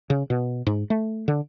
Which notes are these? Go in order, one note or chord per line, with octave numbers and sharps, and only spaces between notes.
C#3
B2
G#2
A3
D3